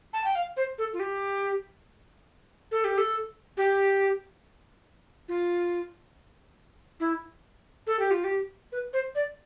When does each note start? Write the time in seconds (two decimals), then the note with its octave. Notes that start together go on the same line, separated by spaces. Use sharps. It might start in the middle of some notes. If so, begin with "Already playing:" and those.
0.13 A5
0.24 G5
0.35 F5
0.57 C5
0.78 A4
0.93 F4
1.00 G4
2.71 A4
2.84 G4
2.98 A4
3.57 G4
5.29 F4
7.00 E4
7.87 A4
7.99 G4
8.11 F4
8.24 G4
8.72 B4
8.93 C5
9.15 D5